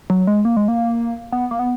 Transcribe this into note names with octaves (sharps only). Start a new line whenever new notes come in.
F#3
G#3
A#3
G#3
A#3
B3
A#3
B3